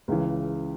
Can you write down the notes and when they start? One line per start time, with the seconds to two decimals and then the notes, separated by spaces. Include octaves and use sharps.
0.08 C#2 C#3 E3